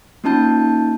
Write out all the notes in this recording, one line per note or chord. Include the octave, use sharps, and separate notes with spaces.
A#3 C#4 D#4 F4 A5 G6